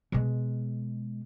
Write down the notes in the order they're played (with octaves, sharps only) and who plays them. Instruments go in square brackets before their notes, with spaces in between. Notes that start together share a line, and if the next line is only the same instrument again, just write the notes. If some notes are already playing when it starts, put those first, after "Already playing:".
[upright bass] B2 G#3